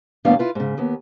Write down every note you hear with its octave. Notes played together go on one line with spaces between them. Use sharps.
D#2 A2 G3 B3 D4 F5
E4 F4 B4
G#2 C#3
D#2 B3